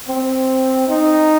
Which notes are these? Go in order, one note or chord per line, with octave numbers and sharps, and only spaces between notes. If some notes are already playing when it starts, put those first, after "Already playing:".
C4
D#4